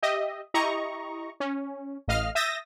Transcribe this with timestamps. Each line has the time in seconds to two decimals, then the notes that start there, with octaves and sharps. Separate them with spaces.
0.02 G4 D#5 E5
0.54 E4 G4 D#5 A#5 C#6
1.40 C#4
2.08 A1 A2 D#5 F5 F6
2.35 E5 D#6 E6 G6 A6 A#6